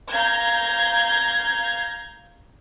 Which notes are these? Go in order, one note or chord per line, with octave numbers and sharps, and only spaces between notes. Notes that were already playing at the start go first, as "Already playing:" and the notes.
F5 A#5 G6 G#6